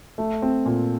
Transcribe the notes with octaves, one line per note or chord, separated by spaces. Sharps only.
A3
C4
A#2